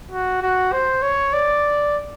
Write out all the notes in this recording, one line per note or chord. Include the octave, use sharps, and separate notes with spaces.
F#4
F#4
C5
C#5
D5